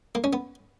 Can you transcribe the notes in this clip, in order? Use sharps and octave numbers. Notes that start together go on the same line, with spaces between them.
A#3
C#4
B3